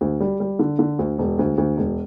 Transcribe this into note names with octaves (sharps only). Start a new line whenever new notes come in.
D2
G3
G3
D3
D3
D2
E1
D2
D2
E1